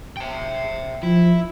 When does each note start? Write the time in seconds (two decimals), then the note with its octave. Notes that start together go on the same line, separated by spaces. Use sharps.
0.17 E5 G5
1.03 F3 E4